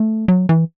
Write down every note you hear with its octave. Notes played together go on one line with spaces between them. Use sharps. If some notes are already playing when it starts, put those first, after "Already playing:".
Already playing: A3
F#3
E3